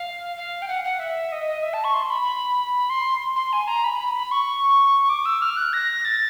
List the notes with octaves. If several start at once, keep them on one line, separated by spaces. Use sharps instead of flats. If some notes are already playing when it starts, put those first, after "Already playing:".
Already playing: F5
F5
G5
F#5
F#5
E5
D#5
D#5
E5
A5
C#6
C6
B5
C6
C6
G#5
A#5
B5
B5
B5
C#6
D6
E6
F6
F#6
A#6
A6